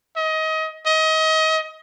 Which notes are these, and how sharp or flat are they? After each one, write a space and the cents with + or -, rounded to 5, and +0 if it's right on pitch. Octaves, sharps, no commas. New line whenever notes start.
D#5 +25
D#5 +30